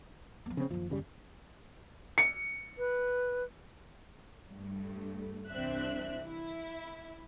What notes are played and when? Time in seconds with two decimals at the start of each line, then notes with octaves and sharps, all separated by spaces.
0.46 F3 B3
0.57 C#3 C4
0.71 F#1 D#3 F3
0.90 D#2 C#3 G3
2.18 C#7
2.78 B4
4.51 G2 A3
5.48 C2 E3 C4 D4 E5 F#6
6.26 E4